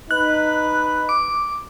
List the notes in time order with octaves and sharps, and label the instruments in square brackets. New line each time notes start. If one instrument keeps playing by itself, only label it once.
[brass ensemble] D#4 B4 [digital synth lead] F#6
[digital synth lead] D6